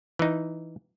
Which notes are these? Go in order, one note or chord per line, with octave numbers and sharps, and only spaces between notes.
E3 D#4